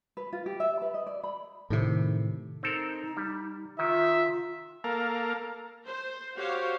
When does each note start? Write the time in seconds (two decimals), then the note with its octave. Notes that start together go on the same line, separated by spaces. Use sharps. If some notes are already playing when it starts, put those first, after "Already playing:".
0.17 B4
0.33 F4
0.46 G4
0.60 E5
0.82 B4
0.94 D#5
1.07 D5
1.23 B5
1.70 A2 C3 D#3
2.63 C4 D#4 A4 A#4
3.17 G3
3.79 D#3 F4 E5
4.84 A#3 A4 A#4 F5
5.86 C5
6.36 F#4 G4 C5 C#5 F5